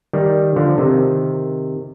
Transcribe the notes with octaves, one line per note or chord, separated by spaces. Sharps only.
D#3 G3
D3 F3
C3 D#3